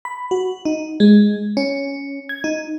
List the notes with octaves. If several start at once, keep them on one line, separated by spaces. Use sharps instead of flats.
B5
F#4
D#4
G#3
C#4
G#6
D#4